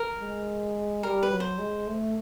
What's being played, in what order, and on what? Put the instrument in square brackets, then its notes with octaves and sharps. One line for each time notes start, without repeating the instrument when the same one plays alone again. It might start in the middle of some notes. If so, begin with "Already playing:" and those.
Already playing: [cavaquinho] A#4
[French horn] G#3
[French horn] G3 [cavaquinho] A#4
[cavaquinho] B4
[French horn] F#3
[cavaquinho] C5
[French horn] G#3
A3